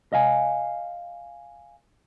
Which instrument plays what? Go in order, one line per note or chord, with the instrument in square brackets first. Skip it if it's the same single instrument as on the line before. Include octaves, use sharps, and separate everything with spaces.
[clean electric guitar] D#5 F5 G#5